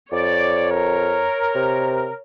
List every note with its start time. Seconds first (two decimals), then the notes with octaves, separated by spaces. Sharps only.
0.12 F2 C#5 D5
0.71 A#4
1.55 C3